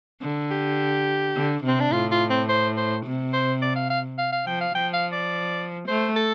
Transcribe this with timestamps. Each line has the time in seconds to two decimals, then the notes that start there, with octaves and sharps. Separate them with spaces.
0.22 D3
0.51 G4
1.36 D3
1.64 C3 C4
1.80 D4
1.92 A2 F4
2.11 F4
2.30 C4
2.49 C5
2.77 C5
3.06 C3
3.33 C5
3.62 D5
3.76 F5
3.90 F5
4.18 F5
4.32 F5
4.46 F3 G5
4.61 F5
4.75 F3 G5
4.94 F5
5.12 D5
5.88 A3 C5
6.16 A4